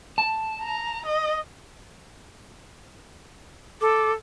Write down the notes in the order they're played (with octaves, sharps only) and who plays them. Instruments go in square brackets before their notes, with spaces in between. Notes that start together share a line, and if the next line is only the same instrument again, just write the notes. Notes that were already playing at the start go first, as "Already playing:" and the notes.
[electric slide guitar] A5
[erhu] A#5
D#5
[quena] A4 [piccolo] D6